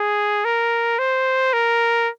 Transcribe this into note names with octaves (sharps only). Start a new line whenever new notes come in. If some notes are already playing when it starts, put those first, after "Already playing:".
Already playing: G#4
A#4
C5
A#4